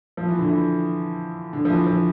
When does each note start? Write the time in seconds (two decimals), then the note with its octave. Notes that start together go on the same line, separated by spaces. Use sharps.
0.17 F3
0.28 E3
0.38 D3
0.49 E3
1.53 D3
1.65 F3
1.70 E3
1.87 F3